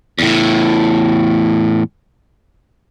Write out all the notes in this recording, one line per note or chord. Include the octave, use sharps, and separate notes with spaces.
E2 A2